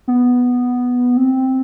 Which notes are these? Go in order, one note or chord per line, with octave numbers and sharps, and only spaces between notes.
B3
C4